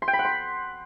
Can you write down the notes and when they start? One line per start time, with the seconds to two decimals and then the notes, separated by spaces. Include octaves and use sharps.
0.02 C6
0.08 G5
0.13 B5
0.19 F#5
0.25 C6